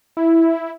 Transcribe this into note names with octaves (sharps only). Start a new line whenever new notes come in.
E4